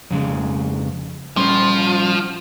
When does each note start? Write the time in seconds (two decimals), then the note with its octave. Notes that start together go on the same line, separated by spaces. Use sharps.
0.11 F2 C#3 G#3
1.37 F3 G3 C#4 C5